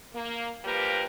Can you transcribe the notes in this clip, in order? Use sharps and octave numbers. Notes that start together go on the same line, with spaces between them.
A#3
F3 G3 A#3 G4 A#4 B4